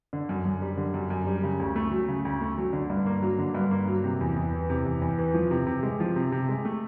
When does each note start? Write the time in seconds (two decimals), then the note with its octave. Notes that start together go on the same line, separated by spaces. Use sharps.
0.13 D3
0.29 F#2
0.45 F#2
0.62 G3
0.77 D3
0.94 F#2
1.10 F#2
1.27 G3
1.43 C#3
1.59 D2
1.76 A3
1.91 F#3
2.08 C#3
2.25 D2
2.41 A3
2.58 F#3
2.73 D3
2.90 G2
3.06 A#3
3.22 F#3
3.39 D3
3.55 G2
3.71 A#3
3.88 F#3
4.04 C3
4.21 E2
4.36 E2
4.52 E3
4.70 C3
4.85 E2
5.02 E2
5.18 E3
5.34 F3
5.51 C3
5.67 C3
5.83 G#3
6.00 F3
6.16 C3
6.32 C3
6.49 G#3
6.65 A3